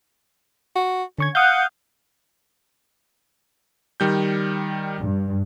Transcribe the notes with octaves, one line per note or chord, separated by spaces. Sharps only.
F#4
D3 C#4 C#6 G#6
F5 F#5 D#6 F6 G6
D#3 G3 G6
G2